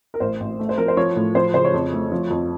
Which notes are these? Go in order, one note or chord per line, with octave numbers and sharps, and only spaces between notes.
A#4
A1 C5
A1
A3
C5
F3 A#4
C5
F3 C#5
A2
F3 C5
C#3 C5
C#5
F2
A3
F3
F2